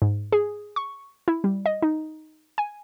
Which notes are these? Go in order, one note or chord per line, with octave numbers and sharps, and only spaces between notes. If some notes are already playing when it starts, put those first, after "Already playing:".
G#2
G#4
C#6
E4
G3
D#5
D#4
G#5